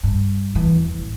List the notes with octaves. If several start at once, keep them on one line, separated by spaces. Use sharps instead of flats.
G2
E3
E2
A1